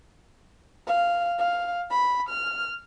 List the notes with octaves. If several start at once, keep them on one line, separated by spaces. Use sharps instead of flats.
F5
F5
B5
F6